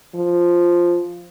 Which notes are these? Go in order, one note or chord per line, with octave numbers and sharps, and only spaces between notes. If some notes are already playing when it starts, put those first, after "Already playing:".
F3